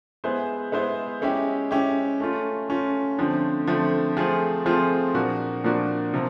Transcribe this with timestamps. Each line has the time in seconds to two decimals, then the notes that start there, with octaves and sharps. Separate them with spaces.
0.24 G#3 B3 E4 G#4 C5
0.72 G#3 B3 E4 G#4 C5
1.22 G#3 C#4 E4 G4
1.71 G#3 C#4 E4 G4
2.20 A3 C#4 F4
2.69 A3 C#4 F4
3.18 D3 F3 A3 C4
3.67 D3 F3 A3 C4
4.17 F3 A3 C4 F4 G#4
4.66 F3 A3 C4 F4 G#4
5.14 A#2 F3 A#3 D4 F#4
5.64 A#2 F3 A#3 D4 F#4
6.14 C3 F3 A#3